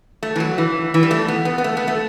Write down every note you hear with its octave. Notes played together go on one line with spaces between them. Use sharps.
A3
E3
F#3
E3
E3
G3
A3
B3
B3
B3
A3
B3
A3